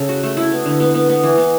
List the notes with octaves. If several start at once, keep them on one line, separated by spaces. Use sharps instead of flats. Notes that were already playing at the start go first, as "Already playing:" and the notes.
Already playing: C#3 A4
F#4
A3
E4
B3
D3
B3
B3
B3
E3
B3